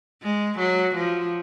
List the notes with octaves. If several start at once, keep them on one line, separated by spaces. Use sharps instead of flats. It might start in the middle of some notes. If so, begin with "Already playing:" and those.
G#3
F#3
F3